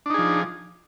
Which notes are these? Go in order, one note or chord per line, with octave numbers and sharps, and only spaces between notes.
F3 D4 D#4 G#4